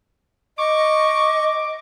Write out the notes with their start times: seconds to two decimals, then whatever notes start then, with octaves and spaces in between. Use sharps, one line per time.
0.58 D#5 C#6 D6